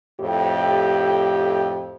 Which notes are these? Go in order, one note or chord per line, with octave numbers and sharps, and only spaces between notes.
F2 A2 G4